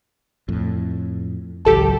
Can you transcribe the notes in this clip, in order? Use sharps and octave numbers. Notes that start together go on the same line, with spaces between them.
F2 A2
G#1 C#2 F#3 G4 A4 A5